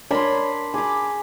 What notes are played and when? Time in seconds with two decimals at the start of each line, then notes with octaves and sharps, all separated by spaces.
0.11 D4 A#4 C#5 B5 C6
0.74 G#4 B5 D6